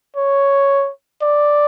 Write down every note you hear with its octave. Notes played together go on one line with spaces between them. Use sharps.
C#5
D5